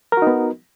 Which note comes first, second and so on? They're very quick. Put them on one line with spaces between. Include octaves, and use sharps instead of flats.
A#4 F#4 D#4 B3